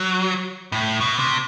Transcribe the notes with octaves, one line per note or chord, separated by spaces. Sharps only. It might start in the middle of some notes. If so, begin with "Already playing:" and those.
Already playing: F#3
A2
B2
C3